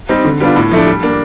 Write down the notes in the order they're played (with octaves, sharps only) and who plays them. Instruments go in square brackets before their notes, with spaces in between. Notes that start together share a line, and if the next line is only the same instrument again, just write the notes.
[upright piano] G3 C4 D#4
D3
G3 B3 D4 F4
A2
F3 A3 D4
G3
A#3 D4